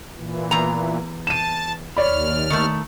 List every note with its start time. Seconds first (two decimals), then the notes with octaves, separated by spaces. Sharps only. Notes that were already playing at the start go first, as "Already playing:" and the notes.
0.16 A#2 E3
0.51 E2 A#5
1.27 A5 D#7 E7
1.97 D#2 C#5 D5 B5 F6
2.50 D#3 A3